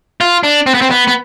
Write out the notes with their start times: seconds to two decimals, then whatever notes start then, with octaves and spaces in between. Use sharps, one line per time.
0.21 F4
0.43 D4
0.66 C4
0.74 B3
0.81 C4
0.91 B3
1.08 B3